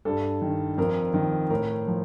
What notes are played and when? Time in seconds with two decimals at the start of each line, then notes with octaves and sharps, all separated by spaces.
0.05 G2 A4
0.42 D#3
0.78 F2 A#4
1.14 D#3
1.50 A2 A#4
1.87 F3